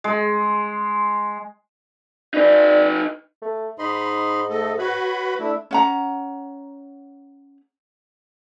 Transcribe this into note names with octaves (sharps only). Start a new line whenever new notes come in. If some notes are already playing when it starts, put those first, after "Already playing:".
G#3
D#4 B4 D5
A3
G#2 D#4 D#5 B5 C6
A3 A4 D#5
F#4 B4 C#5 B5
A3 D4 E4
C#4 F#5 A#5